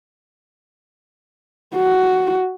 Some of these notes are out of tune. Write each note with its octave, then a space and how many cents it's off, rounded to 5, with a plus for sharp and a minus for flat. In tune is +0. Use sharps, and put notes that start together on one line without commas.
F#4 +10